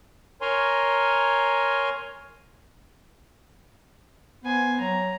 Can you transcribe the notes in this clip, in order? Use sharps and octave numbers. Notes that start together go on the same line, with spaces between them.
A#4 C#5 G#5 A#5 C6
B3 C5 G#5
F#3 A#5